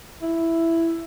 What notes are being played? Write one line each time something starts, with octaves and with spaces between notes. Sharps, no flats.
E4